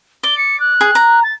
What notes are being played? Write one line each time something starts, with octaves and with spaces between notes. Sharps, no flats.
D5 G7
C#7
F#6
G#4
A#5
A6